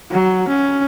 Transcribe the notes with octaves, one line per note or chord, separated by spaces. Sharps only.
F#3
C#4